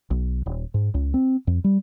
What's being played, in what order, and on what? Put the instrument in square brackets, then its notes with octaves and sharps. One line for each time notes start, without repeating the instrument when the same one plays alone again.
[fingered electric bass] B1
D#1
G#2
C#2
C4
F2
G3